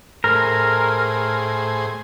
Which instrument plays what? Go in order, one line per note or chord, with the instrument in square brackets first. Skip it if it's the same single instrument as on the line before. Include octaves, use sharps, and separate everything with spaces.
[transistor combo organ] A2 G#4 C5 [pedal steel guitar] A#4